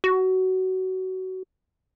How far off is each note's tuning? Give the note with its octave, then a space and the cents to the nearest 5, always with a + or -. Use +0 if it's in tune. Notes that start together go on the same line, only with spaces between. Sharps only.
F#4 +20